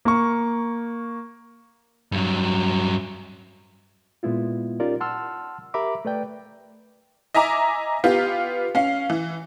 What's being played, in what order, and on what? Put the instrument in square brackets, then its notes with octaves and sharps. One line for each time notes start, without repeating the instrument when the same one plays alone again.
[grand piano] A#3 C#6
[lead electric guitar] G2 F#3
[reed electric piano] A#2 G#3 B3 E4 F4
C#4 D#4 F4 G4 A#4 D5
F#5 A5 C6 E6 F6
G4 A#4 E5 A#5 B5 D6
A3 B4 D5 G5
[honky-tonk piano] D#5 E5 G#5 A#5 D6
B3 F4 G4
C#4 F5
E3